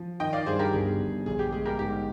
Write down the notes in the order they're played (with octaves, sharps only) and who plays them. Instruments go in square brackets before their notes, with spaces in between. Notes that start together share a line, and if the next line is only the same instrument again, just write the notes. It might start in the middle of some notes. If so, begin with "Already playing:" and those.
Already playing: [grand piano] F3
[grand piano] D#3 [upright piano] D#5 G5
[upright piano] D5 F5
[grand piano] G2 [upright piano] G#4 C5
[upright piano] G4 A#4
[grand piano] G1 [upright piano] G#4
[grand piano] G1
[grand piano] A#1 [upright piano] G#4
[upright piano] G4
[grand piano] G#3 [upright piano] G#4
[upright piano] G4 A#4
[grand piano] G#2 [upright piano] G4